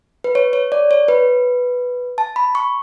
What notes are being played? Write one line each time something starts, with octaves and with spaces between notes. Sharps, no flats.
B4
C#5
C#5
D5
C#5
B4
A5
B5
C#6